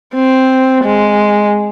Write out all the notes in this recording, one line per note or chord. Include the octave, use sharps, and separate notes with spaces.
C4
G#3